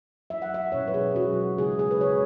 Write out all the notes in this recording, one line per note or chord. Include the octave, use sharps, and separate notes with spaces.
F#3 E4 E5
F#5
E5
B2 F#3 C#4 E4 C#5
B4
G#4
B2 F#3 C#4 E4 F#4
C#3 G#3 E4 G#4
G#4
B4
C#3 G#3 E4 C#5